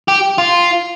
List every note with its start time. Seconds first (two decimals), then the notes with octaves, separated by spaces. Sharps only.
0.08 G4
0.38 F4